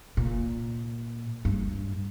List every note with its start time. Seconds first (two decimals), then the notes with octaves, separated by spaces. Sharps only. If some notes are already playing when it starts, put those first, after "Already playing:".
0.17 A#2
1.45 G2